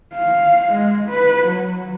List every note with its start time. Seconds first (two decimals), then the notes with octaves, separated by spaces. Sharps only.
0.14 F5
0.72 G#3
1.09 B4
1.47 F#3